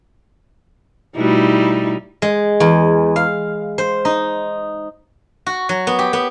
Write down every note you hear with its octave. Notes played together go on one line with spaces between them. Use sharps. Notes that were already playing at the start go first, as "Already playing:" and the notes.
B2 G3 A3 D#4 E4 F#4
G#3
E2
F5
C5
D#4
F#4
F#3
B3
G4
B3